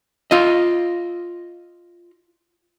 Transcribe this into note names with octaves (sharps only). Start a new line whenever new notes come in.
F4 D#5